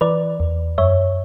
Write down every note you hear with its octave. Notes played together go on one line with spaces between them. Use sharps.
E3 B4 D5
E2
F#2 C#5 E5